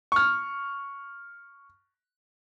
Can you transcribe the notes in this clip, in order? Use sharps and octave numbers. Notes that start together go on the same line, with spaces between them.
C#6 F6